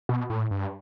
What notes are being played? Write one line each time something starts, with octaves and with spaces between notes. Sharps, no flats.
B2
A2
G2